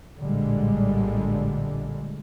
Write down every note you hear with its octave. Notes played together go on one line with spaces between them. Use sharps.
A#1 A2 D3 G3 G#3